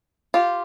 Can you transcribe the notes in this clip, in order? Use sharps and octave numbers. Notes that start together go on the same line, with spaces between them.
F4 G4